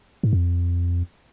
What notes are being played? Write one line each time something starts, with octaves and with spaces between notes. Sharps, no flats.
G#2
F2